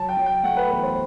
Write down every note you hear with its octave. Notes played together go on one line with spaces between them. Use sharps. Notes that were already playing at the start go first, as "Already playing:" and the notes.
Already playing: F#3 A5
G5
F#3
G5
A3 F#5
B4
E2 B4
C5